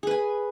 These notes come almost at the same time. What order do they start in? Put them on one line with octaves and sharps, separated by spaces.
G#4 B4 G#5